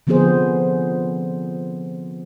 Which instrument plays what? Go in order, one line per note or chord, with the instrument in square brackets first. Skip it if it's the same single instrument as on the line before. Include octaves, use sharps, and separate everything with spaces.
[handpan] D3 F3 B3 C4 G#4 C5